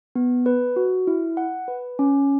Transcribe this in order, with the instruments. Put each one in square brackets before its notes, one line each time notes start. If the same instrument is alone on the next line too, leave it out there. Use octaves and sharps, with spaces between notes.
[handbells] B3
B4
F#4
E4
F#5
B4
C#4